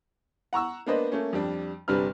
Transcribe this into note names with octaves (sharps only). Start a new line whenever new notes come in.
F#5 A#5 C#6 E6
A#3 B3 D4 B4 C5 D#5
A3 A#3 C#4
F2 G3 D4
G1 C3 G3 D4 B4 F6